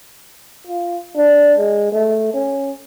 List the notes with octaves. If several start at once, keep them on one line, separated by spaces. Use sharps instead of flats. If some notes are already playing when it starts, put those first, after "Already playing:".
F4
D4
G#3
A3
C#4